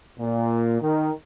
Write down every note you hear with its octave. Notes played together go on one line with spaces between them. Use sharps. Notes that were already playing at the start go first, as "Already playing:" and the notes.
A#2
D#3